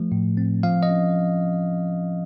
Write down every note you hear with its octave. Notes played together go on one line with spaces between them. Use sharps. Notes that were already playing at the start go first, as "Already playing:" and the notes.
Already playing: F3 A3
A2
C4
F3 F5
D#5
C#4